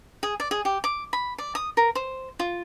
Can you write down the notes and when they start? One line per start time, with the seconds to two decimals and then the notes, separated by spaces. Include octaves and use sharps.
0.23 G#4
0.40 D5
0.51 G#4
0.65 G4
0.84 D6
1.13 B5
1.38 D5
1.55 D#6
1.77 A#4
1.95 C5
2.39 F4